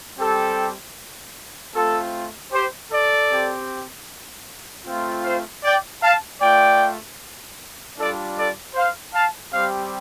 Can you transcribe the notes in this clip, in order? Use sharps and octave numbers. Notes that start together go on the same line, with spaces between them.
G3 C4 G4 A4
A3 C4 F4 A4
G4 C5
A4 D5
C4 G4
A3 C4 F4
C5 F5
D5 G5
F5 A5
A3 F4 D5 G5
G3 D4 F4 A4 D5
A4 D5
C5 F5
F5 A5
G3 C4 G4 C5 F5